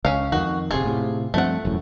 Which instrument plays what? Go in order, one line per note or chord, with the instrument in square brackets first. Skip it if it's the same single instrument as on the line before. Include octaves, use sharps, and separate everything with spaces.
[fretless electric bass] C#2 [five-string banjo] C#4 F5
[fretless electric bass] F2 D#3 [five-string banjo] F#4
[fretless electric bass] D1 C3 [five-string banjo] F4 G#4
[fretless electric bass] A2 C3
[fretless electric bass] G2 F3 C4 [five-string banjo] A3 F#5
[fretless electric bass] E1 F#2 A2